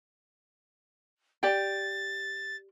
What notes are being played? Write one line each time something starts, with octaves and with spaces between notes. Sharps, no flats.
G4 D5 G5 A6